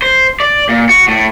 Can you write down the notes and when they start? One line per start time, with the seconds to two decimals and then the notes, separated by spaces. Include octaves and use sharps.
0.02 C5
0.40 D5
0.69 A#2
0.89 F#4
1.08 A2